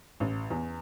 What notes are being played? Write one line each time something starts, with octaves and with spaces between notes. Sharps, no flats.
A1
E2